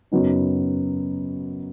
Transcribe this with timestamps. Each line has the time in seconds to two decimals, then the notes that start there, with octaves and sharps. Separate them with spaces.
0.12 F#2 C#3 F#3 B3 D#4